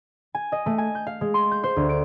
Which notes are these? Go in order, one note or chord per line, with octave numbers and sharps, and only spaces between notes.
G#5
D#5
A3
G#5
G6
F5
G#3
C6
G6
C5
D2
D7